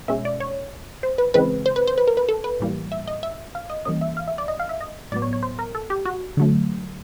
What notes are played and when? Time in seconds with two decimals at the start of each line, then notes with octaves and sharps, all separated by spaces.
0.08 B2 G#3 C#4 E5
0.25 D5
0.40 C#5
1.03 C5
1.18 B4
1.34 C#3 E3 G#3 C4 B4
1.66 C5
1.76 B4
1.87 C5
1.98 B4
2.07 A#4
2.17 B4
2.29 A4
2.44 B4
2.60 A2 E3 G3 A#3
2.92 E5
3.07 D#5
3.23 E5
3.55 F5
3.70 D#5
3.85 E3 G3 A#3 C#4 D#5
4.01 E5
4.17 F5
4.28 E5
4.38 D5
4.48 D#5
4.60 F5
4.69 E5
4.81 D#5
5.12 A2 F#3 B3 D5
5.22 C#5
5.33 C#5
5.43 C5
5.59 A#4
5.75 A4
5.90 G4
6.05 F#4
6.37 D3 F#3 A3